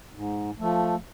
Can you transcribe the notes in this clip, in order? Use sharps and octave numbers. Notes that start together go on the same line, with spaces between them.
G#2
F3 A3